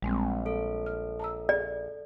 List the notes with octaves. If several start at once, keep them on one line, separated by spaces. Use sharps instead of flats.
A#1 G3 G#3 C4
A4
F6
A5 A#5 E6
G#4 D5